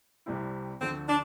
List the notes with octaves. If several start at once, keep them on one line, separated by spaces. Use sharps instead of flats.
C2 C3 G3 C4 E4
D2 D3 F3 C4
D4